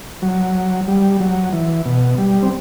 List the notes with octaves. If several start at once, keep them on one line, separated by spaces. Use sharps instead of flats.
F#3
G3
F#3
E3
B2
G3
C4